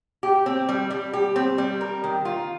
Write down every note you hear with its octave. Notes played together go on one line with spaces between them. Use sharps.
G4
C4
G3
G3
G4
C4
G3
A#4
D#3
F4